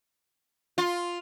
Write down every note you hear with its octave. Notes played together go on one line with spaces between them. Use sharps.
F4